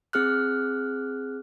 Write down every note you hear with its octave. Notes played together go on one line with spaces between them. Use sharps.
C4 G#4 F6 F#6